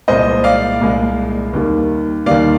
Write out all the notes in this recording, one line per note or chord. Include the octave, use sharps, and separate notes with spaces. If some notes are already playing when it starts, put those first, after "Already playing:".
C2 A#2 G#3 C5 D#5
D5 F5
C2 A#2 G#3
D#2 D#3 G3 A#3
D#2 D#3 G3 A#3 D5 F5